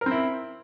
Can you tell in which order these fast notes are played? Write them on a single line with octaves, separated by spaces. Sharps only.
A#4 C4 E4